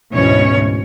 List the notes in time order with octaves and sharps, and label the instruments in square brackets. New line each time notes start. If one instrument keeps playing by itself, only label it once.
[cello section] D2 G#2 B2 E3 C#4 C#5